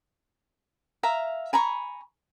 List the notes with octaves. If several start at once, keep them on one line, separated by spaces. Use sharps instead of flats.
E5 F5 A#5
G#5 A#5 B5 C#6